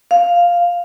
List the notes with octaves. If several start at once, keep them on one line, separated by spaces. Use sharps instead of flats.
F5